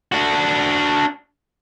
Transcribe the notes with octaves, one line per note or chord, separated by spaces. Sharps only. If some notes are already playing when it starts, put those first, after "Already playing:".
D4 F#4